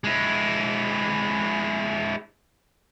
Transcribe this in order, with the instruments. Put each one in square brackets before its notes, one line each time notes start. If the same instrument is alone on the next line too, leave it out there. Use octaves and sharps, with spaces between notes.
[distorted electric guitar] G#3 E4